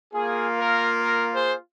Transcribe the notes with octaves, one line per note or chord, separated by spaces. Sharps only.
A#3 F4 G#4
A#4
A#4
G#4 C5